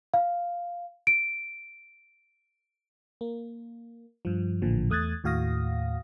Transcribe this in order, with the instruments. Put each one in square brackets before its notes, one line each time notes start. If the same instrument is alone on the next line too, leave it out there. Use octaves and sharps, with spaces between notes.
[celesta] F5
D7
[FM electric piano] A#3
G2 F3
A1 A#2 D3 F3
E2 A3 D#6 F#6 G#6 A6
D#2 A2 F#4 F5 D#6 A#6